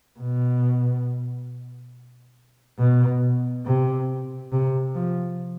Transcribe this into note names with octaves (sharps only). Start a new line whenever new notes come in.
B2
B2
C3
C3
F3